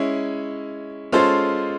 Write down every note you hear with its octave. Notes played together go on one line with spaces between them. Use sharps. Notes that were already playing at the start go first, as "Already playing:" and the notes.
Already playing: G#3 C#4 E4
G#3 C#4 F4 A4 C5